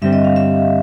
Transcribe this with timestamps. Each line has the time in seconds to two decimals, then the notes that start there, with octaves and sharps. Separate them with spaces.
0.02 G2 D3 G3 C4 E5
0.13 D#5
0.24 F5
0.36 E5